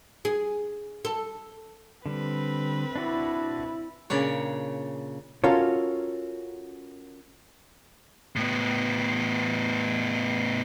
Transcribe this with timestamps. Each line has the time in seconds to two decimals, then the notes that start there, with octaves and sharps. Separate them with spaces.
0.25 G#4
1.05 A4
2.06 D3 G3 C4 B4
2.96 D4 E4 F#4 D5
4.10 A#2 C#3 D4 C#5
5.44 C#4 F4 F#4 A4 A#4 C#5
8.36 A2 B3